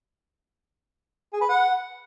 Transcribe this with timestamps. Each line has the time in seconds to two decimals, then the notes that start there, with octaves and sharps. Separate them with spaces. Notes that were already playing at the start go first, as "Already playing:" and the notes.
1.33 G#4
1.41 B4
1.49 F#5